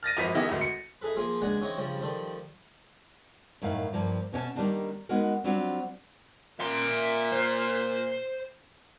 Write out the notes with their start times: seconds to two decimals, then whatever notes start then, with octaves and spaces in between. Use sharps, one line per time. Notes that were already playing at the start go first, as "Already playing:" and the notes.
0.03 F6 A6 A#6 D#7
0.17 G#1 F#2 F3 B4 B6
0.35 D#3 B3 E4 G4 G#4
0.49 G#1 D2
0.61 C#7
1.01 D#4 E4 G#4 A4 B4
1.16 F3 A#3 F4 G#4
1.41 C#2 G#3 D4 D5 F#5 G#5
1.61 E3 C4 D#4 C#5
1.77 G2 C#3 F3 G3
2.00 D#3 F3 G3 A4 D5
3.62 F#2 A2 D#3 F5
3.93 G2 F3 A#3
4.32 B2 C#4 C#5 A5
4.55 D#3 G3 G#3 A#3 D4 D#4
5.09 G#3 B3 D#4 F#4 A#4
5.44 F#3 G3 C4 D4 F4 F#4
6.60 A#2 E5 C6
7.32 C5